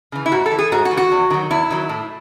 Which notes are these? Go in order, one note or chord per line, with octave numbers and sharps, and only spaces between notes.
C#3 E3
E4
G#2 F#4
A4
E3
G#4
G#2 F#4
F#4
E3
F#4
E2
D#3 F#3
E2 E4
D#3 F#3
A2